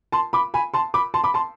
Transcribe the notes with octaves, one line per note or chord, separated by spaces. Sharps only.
A5 C6
B5 D6
G#5 B5
A5 C6
B5 D6
A5 C6
B5 D6
A5 C6